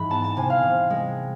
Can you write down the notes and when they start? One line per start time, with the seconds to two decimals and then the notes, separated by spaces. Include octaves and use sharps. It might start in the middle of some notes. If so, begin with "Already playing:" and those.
Already playing: G#2 E3 B5
0.10 B3 A5
0.24 A5
0.37 C3 G#5
0.50 F5
0.63 C3
0.90 G#3